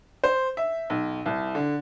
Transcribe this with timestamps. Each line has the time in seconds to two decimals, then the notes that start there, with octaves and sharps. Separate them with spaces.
0.24 C5
0.57 E5
0.90 B1
1.26 C2
1.55 D3